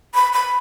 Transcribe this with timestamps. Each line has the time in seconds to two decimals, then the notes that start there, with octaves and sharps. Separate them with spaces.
0.15 B5
0.33 B5